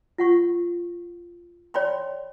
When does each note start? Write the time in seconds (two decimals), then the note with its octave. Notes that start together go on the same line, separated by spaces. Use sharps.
0.18 F4 F#5 C#6
1.74 C#5 D5 G5 B5 C6